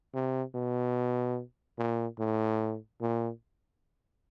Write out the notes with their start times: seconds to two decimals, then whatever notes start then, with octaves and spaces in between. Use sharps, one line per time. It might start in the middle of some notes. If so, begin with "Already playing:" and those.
0.14 C3
0.55 B2
1.78 A#2
2.19 A2
3.01 A#2